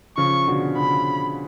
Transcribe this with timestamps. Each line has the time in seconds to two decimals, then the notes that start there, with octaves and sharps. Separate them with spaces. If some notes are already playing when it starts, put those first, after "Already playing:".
0.17 C#3 F3 C#6
0.47 B2 D3
0.77 C#3 F3 B5